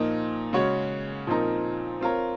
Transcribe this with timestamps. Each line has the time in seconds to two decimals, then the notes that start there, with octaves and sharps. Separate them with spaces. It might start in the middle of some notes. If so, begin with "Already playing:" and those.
Already playing: A#2 F3 A#3 D#4
0.53 C#3 G#3 C#4 F#4 C#5
1.27 A#2 F3 C4 D#4 A#4
2.01 C4 F4 A#4 C#5